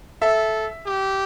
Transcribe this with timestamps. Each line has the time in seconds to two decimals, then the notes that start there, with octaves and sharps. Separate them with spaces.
0.22 A4 E5
0.86 G4